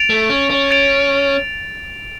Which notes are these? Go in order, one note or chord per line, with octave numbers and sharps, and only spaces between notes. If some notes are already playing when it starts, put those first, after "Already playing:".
Already playing: A6 D7 F7
A3
C#4
C#4
A6 D7 F7